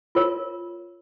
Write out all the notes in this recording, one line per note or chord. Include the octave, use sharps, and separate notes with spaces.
F4 A#4 C#5